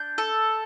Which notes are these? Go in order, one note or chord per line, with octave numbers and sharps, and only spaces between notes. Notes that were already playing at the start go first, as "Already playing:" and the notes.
Already playing: D4 G6
A4